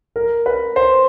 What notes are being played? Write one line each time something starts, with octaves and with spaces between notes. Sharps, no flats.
A#4
B4
C5